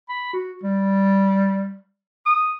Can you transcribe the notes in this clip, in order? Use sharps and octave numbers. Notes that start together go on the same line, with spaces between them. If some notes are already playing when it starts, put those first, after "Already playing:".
B5
F#4
G3
D#6